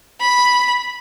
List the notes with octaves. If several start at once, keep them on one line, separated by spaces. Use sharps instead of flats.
B5